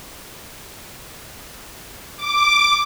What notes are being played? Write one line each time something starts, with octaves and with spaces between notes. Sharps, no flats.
D6